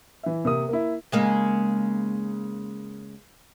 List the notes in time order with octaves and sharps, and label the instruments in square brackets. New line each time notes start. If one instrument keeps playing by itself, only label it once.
[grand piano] E3 E5
C3 A#3 D#6
A#3 E4
[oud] C#3 G#3 A#3